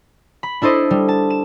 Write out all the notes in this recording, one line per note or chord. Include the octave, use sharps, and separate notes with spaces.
B5
D4 E4 A4 C5 D#5
G3
A5
E7